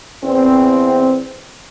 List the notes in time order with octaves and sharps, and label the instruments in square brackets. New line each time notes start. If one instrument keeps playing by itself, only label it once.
[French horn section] E2 C4